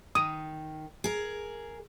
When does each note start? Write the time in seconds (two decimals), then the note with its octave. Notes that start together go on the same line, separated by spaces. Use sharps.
0.15 D#3 D#6
1.04 G#4 A#4